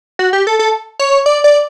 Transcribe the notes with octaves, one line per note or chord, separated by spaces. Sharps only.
F#4
G4
A4
A4
C#5
D5
D5